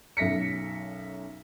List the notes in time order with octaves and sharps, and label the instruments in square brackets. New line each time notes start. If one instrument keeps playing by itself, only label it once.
[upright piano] B1 F#2 E5 A#6 B6 C#7